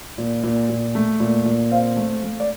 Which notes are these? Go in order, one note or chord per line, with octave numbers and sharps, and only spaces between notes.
A#2
A#2
A#2
A3
A#2
A#2
C4 F5
A3
A3
D5